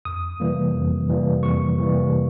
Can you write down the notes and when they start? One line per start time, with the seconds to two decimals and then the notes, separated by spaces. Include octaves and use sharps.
0.05 F2 D#6
0.40 C3 E3 G3 A#3
0.74 F2
1.09 C3 E3 G3 A#3
1.43 F2 C#6
1.78 C3 E3 G3 A#3